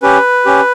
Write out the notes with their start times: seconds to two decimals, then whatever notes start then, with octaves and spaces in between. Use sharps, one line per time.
0.02 C#4 G4 B4
0.45 C#4 G4